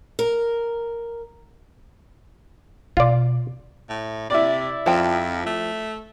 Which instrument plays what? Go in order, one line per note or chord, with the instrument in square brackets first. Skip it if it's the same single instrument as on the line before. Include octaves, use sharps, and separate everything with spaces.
[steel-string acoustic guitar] A#4
[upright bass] B2 [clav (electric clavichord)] F4 D5
[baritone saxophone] A2
[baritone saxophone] C3 [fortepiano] E4 D5
[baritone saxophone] F2 [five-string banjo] F3 G5
[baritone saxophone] A3